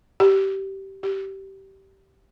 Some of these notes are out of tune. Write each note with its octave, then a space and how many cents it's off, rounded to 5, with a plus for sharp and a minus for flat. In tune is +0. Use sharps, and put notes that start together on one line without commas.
G4 -20
G4 -20